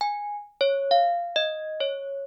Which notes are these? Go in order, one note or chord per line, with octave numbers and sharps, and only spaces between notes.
G#5
C#5
F5
D#5
C#5